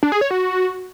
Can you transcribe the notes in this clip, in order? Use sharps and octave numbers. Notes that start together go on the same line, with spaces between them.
D4
G#4
C#5
F#4